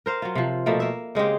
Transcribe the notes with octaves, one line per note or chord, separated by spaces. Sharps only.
A#4 C5 F5
F#3 F4
C3 F3
B2 F3 A3 A#3
A#3 E5
C#3 G#3 C4 G4